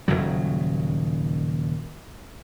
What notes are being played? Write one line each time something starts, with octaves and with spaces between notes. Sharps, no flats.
D#1 G#1 C#3 F#3